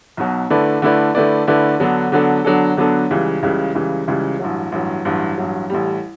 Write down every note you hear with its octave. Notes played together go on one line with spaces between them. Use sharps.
B1 B2 F#3
D3 A3 E4 B4 D5
D3 A3 E4 B4 D5
D3 A3 E4 B4 D5
D3 A3 E4 B4 D5
D3 F#3 B3 D4 A4
D3 F#3 B3 D4 A4
D3 F#3 B3 D4 A4
D3 F#3 B3 D4 A4
C#2 C#3 E3 G3
C#2 C#3 E3 G3
C#2 C#3 E3 G3
C#2 C#3 E3 G3
A1 G2 F#3
A1 G2 F#3
A1 G2 F#3
A1 G2 F#3
A1 A2 G3